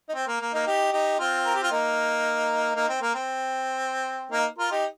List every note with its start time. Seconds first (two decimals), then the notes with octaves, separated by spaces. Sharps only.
0.09 D#4
0.14 C4
0.27 A#3
0.41 A#3
0.53 A#3 D#4
0.66 D#4 G4
0.92 D#4 G4
1.19 C4 F4
1.46 A#4
1.54 G4
1.63 F4
1.71 A#3 D#4
2.75 A#3 D#4
2.89 C4
3.01 A#3
3.14 C4
4.31 A#3 D#4
4.58 F4 A#4
4.71 D#4 G4